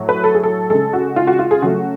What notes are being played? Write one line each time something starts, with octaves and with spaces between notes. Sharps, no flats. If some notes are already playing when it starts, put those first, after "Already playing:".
Already playing: A2 F#3 A3
B4
A4
G#4
A4
C#3 G#3 A4
F#4
F4
F#4
F4
G#4
C#3 F#3 A3 F#4